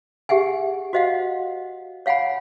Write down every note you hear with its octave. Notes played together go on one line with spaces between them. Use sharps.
G4 G#4 E5 F#5 G#5
F#4 C5 D#5 F5 F#5
C#5 F5 F#5 G#5 B5